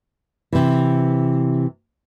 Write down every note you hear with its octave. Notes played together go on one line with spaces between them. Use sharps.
C3 E3